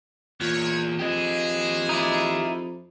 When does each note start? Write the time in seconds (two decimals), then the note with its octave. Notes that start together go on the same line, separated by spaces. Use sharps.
0.40 E2 A#2 C#5
0.99 F2 G4 G#4 D#5
1.89 D#4 E4 D5